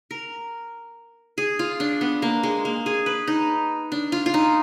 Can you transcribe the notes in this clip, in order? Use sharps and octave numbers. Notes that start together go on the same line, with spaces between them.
A#4
G#4
F4
D4
B3
A#3
G#3
A#3
G#4
B4
D#4
D4
F4
F4
D#4